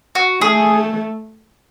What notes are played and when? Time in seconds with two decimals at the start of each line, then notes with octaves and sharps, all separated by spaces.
0.15 F#4
0.41 A3 G#4